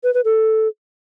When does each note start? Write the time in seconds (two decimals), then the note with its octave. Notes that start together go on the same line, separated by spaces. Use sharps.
0.03 B4
0.14 B4
0.25 A4